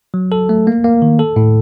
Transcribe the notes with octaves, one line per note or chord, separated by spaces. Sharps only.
F#3
A4
A3
A#3
A#3
D#3
A4
A2